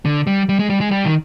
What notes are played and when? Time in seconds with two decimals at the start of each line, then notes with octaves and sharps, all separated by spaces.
0.05 D3
0.27 G3
0.49 G3
0.59 G#3
0.70 G3
0.81 G#3
0.91 G3
1.06 D#3